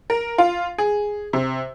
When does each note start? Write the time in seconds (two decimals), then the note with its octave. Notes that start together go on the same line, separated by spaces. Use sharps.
0.10 A#4
0.38 F4
0.78 G#4
1.33 C3